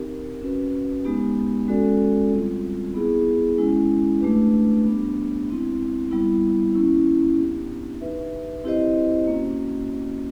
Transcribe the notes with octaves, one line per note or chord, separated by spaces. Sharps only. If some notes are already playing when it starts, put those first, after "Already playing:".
Already playing: C4 D#4 G4 A#4
C#4 F#4 B4
G#3 B3 D#4 G4
G#3 C#4 F#4 A4 D5
G3 C4 F4
B3 E4 G#4
G#3 C#4 E4
A3 D4 G4 B4
G3 B3 D4 G4
G#3 C4 E4
G3 B3 E4
A#3 C#4 E4
B3 D4 G4
D#4 G4 B4 E5
C4 E4 G4 C5 D#5
A#3 C#4 F#4